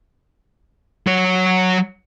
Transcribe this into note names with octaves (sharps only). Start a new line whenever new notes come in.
F#3 C#5